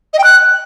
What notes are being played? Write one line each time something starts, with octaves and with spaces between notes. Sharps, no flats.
D#5
G5
F#6